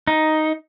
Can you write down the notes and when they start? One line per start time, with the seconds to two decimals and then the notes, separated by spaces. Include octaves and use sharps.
0.07 D#4